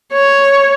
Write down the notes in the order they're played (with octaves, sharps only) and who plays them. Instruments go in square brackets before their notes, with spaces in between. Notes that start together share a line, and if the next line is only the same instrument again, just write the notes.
[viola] C#5